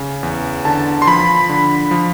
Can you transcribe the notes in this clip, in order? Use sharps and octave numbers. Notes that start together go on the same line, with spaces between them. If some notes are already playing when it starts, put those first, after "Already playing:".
Already playing: C#3
E2
D3 A5
C6
F3 B5
D3
F3